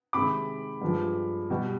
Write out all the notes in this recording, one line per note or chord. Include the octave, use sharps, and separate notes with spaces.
C3 D#3 G#3 B5 D6
G2 F3 G#3
B2 G3